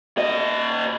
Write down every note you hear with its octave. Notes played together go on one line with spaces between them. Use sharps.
A#2 D#5